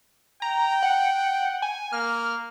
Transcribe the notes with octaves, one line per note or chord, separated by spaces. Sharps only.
G5 A#5
F#5
G#5
A#3 F6